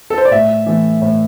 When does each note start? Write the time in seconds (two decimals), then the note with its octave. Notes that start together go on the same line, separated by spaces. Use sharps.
0.10 A4
0.18 C5
0.25 D5
0.31 A2 E5
0.66 E3 A3
1.02 A2